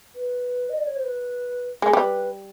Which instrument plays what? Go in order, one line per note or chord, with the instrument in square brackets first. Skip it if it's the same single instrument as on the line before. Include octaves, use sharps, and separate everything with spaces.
[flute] B4
D#5
D5
C#5
C5
B4
[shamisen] G#3 [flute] A#4
[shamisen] G3 [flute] B4